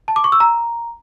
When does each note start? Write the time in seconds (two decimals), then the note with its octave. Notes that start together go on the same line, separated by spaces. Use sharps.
0.08 A5
0.16 D6
0.24 C#6
0.32 E6
0.40 A#5